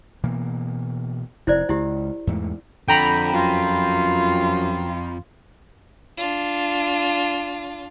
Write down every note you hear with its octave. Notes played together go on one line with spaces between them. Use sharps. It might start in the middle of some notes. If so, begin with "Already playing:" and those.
B2 E3 A#3
F1 E4 C5 D5
C#2 E4 G4
E2 G#2 A3
F2 D3 G5 A#5 B5
F#2 F4
D4 F4